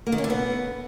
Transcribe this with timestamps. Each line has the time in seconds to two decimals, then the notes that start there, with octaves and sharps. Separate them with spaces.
0.07 A#3
0.12 D#3
0.18 C#4
0.24 D3
0.30 B3